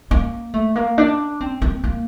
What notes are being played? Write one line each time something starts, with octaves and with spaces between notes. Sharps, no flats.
A#3
A3
A#3
D4
C4
C4
A#3